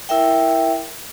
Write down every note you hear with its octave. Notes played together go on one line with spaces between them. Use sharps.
E4 A#4 E5 G5